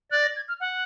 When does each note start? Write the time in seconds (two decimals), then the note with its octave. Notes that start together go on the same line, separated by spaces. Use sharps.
0.11 D5 F#6
0.23 A#6
0.36 G#6
0.48 F6
0.60 F#5